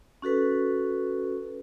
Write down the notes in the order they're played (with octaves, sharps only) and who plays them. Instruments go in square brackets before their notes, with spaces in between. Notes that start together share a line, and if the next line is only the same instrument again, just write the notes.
[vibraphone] C#4 F#4 A4 B4